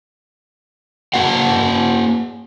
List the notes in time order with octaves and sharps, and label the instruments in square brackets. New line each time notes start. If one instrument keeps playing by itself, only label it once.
[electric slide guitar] A#3 F#4 F5 F#5